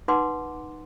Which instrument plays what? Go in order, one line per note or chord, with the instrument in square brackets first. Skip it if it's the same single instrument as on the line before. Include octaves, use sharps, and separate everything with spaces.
[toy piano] D#4 B4 F#5 C6 D6